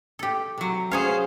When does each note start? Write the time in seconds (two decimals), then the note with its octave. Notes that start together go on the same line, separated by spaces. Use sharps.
0.19 G4 A4
0.58 C3 F#3
0.91 C#4 G#4 C5 C#5 F5